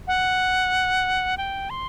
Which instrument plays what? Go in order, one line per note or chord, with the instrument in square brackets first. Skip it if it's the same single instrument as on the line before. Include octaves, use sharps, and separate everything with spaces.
[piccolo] F#5
G5
C6